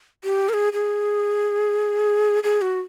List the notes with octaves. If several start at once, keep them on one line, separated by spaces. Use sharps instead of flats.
G4
A#4
G#4
G#4
G#4
F#4